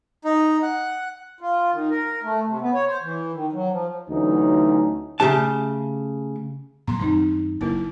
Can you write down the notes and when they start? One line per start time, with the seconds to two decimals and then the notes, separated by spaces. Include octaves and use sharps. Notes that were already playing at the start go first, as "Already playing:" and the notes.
0.24 D#4
0.63 F#5
1.41 F4
1.73 D#3
1.90 A#4
2.24 A3
2.47 C3
2.61 B3
2.74 C#5
2.87 C5
3.03 E3
3.33 D#3
3.53 F#3
3.71 F3
4.09 D2 E3 F#3 C#4 D#4
5.20 C#3 A3 G4 A5
6.88 A#2 F#3 A#3 A#5 C6
7.00 F#2 D#3 C4 D#4
7.61 F#1 A#3 E4 A#4